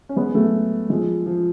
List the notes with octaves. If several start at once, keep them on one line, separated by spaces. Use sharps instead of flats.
C#4
G#3 B3
F#3 A3
F3 G#3
F3